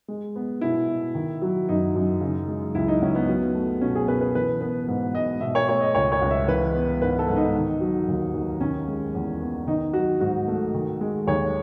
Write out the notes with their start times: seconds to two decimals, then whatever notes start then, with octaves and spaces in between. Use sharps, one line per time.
0.08 G#3
0.36 B3
0.61 B2 E4
0.89 B2
1.15 D#3
1.42 F#3
1.69 F#2 D#4
1.95 F#2
2.21 C#3
2.48 G#3
2.75 C#2 E4
2.88 D#4
3.02 C#2 C#4
3.15 B3
3.28 F#3
3.55 A3
3.81 B2 C#4
3.95 G#4
4.08 B2 B4
4.21 B4
4.35 E3 B4
4.61 B3 B4
4.88 G#2
5.15 G#2 D#5
5.41 B2 E5
5.55 C#5
5.68 A3 C#5
5.81 D#5
5.95 C#2 C#5
6.12 C#5
6.21 C#2
6.31 E5
6.48 E3 B4
6.74 B3
7.01 G#2 B4
7.19 A4
7.28 G#2
7.36 D#4
7.55 D#3
7.80 F#3
8.08 D#2
8.34 D#2
8.61 D#3 C#4
8.88 G#3
9.15 E2
9.41 B3
9.67 D#3 D#4
9.93 F#3 F#4
10.20 G#2 F#4
10.48 A3
10.74 D#3
11.01 G#3
11.27 D#2 C#5